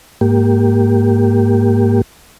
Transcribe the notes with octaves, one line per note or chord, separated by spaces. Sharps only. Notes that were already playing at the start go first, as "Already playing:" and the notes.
G#2 A#3 G4